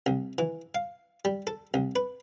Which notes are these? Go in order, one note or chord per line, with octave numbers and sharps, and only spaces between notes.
C2
E3
F5
G3
A4
C2
B4